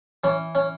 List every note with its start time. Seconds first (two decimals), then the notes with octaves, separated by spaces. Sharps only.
0.24 E3 C#4
0.55 C#4